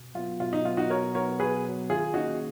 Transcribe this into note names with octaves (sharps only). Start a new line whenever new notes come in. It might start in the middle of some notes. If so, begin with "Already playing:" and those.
Already playing: B2
F#3 B3 F4
B2 F4
D#4
F#3 B3 F4
D#4 F#4
B2 A#4 C#5
F#3 B3 A#4 C#5
B2 G#4 B4
F#3 B3
D#3 F4 G#4
A#3 C#4 D#4 F#4 G#4